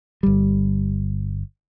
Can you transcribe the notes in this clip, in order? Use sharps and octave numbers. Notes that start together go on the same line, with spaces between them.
G1 G3